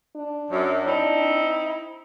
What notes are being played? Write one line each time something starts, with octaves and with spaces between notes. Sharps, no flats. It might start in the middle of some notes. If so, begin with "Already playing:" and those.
D4
F#2
C4 D#4 E4